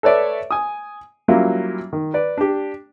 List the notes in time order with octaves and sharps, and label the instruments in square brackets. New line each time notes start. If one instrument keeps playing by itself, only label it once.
[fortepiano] A4 B4 C#5 D5 E5
G#5 D#6
F#3 G3 A#3 C#4 E4 F4
D#3
B4 D5
D4 G4